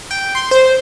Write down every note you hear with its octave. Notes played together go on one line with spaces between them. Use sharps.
G5
C6
C5